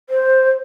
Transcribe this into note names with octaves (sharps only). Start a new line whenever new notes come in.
C5